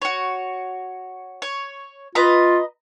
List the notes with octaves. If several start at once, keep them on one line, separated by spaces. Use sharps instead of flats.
F#4 C#5
C#5
F4 B4 D#5 A#5